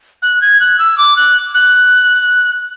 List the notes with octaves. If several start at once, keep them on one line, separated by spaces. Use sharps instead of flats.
F#6
G#6
F#6
E6
D6
F#6
F#6